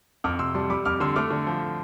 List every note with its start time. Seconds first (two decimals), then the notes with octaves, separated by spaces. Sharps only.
0.24 F2 D6 F6
0.39 C3 C6 E6
0.54 G3 A5 C6
0.70 G3 B5 D6
0.85 F2 D6 F6
1.00 D3 C6 E6
1.16 A3 D6 F6
1.31 D3
1.47 F3